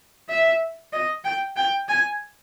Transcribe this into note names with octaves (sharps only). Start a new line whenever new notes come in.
E5
D#5
G5
G5
G#5